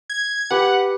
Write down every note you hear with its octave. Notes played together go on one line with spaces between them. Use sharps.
G#6
G4 B4 F#5